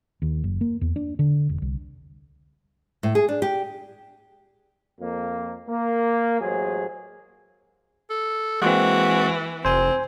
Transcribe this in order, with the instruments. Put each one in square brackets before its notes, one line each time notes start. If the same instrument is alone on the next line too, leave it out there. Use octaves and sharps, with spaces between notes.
[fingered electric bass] D#2
F#1
A#3
E2
D4
D3
E1
C2
[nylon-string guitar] A2
G#4
D4
G4
[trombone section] F2 A#3
A#3
A1 F#3 G#3 G#4 C5
[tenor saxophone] A4
[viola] E3 [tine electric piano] G#3 A#3 C4 [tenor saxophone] F#4
[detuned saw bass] F1 [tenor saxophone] C4 [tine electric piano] C5 G#5